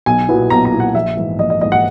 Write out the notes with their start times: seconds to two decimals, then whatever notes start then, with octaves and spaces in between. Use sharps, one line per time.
0.06 B1 G#5
0.28 A#2 F#3 B3 E4
0.50 B1 A#5
0.65 A#5
0.72 A#2 F#3 B3 E4
0.80 F#5
0.95 A#1 E5
1.17 G#2 E3
1.39 A#1 D#5
1.50 D#5
1.61 G#2 E3 D#5
1.72 F#5